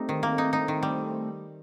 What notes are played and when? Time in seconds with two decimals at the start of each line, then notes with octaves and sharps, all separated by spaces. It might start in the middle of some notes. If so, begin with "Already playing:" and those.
Already playing: G3 A3 C4 D#4
0.09 D#3
0.23 A#3
0.38 D#4
0.53 D#4
0.68 D#3
0.83 G3